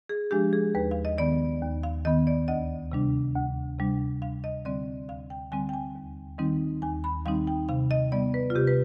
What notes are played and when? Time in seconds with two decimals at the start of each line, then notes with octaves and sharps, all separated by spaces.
0.09 G#4
0.31 F3 G#3 D4 G4
0.53 G#4
0.75 D#2 B4
0.91 F5
1.05 D#5
1.18 D#3 B3 D5
1.62 D#2
1.83 F5
2.05 D#3 B3 D#5
2.27 D5
2.48 D2 D#5
2.92 C3 G3 D4
3.35 D2
3.79 C3 G3 D4
4.22 D2 F5
4.44 D#5
4.65 D3 G3 C4 D5
5.09 D2 F5
5.30 G5
5.52 D3 G3 C4 G#5
5.69 G5
5.74 G#5
5.95 D#2
6.38 D#3 G3 C4 D#4
6.82 D#2 G#5
7.04 B5
7.26 D#3 G3 C4 D#4 F5
7.47 G5
7.69 C3 F5
7.91 D#5
8.12 G3 B3 D5
8.34 B4
8.50 F4
8.56 C3 G4
8.67 B4